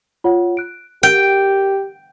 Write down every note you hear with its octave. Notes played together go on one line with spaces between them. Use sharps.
F4 C#5 F#5
F#6 D7
G4 A#4 G5